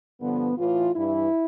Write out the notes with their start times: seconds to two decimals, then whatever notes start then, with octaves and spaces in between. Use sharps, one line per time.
0.21 G2 D3 F3 B3
0.58 A2 E3 F4
0.96 G2 E3 E4